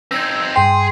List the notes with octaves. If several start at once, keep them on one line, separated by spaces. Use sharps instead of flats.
C4 D#4 E6 G#6
G2 G#4 G5 C6